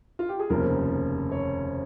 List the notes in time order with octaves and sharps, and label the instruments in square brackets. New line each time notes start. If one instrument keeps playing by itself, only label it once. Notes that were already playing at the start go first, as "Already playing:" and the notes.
[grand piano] F4
G4
G#4
F1 D#2 C#3 F3 A#4
C#5